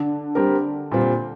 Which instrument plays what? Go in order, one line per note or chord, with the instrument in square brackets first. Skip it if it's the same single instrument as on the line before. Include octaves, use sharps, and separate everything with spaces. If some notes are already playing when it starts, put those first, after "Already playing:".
Already playing: [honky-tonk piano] D3
[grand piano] G3 C4 G4 A#4
A#2 G3 C4 F4